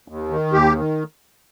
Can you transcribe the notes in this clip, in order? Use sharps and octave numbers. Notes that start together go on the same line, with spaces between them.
D#2
D#3
D#2 G4
D#3